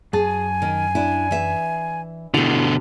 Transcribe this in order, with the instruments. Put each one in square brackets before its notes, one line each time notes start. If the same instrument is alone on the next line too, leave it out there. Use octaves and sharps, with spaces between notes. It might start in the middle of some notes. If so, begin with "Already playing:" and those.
[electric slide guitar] F#2 A5 [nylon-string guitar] G#4 [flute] G#5
[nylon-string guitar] D#3
D4 E4
E3 E5
[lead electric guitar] B2 D3 [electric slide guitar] E4 [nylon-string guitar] F#4 G4